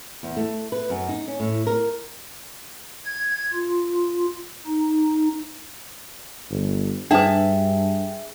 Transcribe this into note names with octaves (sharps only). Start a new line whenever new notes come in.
E2
A3
B4
F#2
D#4
C#4
A2
A#4
G#6
F4
D#4
G1
G2 D4 G#4 B4 E5 G5 A5